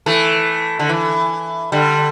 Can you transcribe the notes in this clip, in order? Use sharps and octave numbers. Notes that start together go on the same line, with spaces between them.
E3 A3
D3
E3
D3 G3